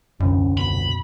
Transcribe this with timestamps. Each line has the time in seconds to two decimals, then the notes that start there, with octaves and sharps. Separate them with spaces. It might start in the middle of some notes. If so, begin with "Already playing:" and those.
0.20 D#1 C2 F#2 D3 C#4
0.57 B2 B5